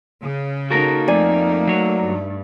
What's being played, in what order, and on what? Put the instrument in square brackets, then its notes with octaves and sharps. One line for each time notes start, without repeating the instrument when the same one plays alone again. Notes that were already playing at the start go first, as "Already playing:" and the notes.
[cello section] C#3
[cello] A#3 D#4 [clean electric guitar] F#4 A4 A#4
[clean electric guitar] F2 G#5 [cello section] A3 [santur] D5
[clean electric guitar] F#3 C#5
[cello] G2